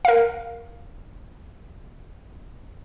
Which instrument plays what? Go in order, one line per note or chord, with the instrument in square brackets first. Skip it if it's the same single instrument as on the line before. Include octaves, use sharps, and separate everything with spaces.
[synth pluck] A#4 F5